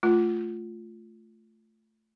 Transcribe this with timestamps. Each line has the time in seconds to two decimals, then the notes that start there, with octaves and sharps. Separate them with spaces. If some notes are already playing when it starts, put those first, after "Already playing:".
0.03 A3 F4